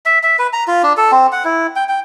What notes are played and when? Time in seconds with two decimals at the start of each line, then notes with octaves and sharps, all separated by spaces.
0.06 E5
0.23 E5
0.39 B4
0.53 A#5
0.68 F4
0.83 D4
0.97 A4
1.12 C4
1.32 F#5
1.45 E4
1.76 G5
1.89 G5